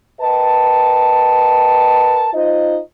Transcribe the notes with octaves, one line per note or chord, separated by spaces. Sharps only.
A#4 B4 D#5 G5 A5
D#4 F4 C5 D#5